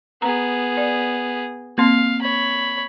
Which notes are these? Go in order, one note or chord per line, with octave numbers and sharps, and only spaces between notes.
B3 G#4 A#5
D5
A#3 C4 F5 C6
C#5 B5